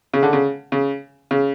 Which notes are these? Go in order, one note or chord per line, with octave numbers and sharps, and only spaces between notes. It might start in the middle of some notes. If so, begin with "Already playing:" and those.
C#3
D3
C#3
C#3
C#3